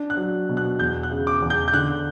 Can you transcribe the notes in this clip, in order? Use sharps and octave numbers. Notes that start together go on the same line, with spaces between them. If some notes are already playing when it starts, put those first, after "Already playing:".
Already playing: D4
F#6
F#3
B2
F#6
E2 G6
F#6
C#3
D6
E2
G6
G6
D3 F#6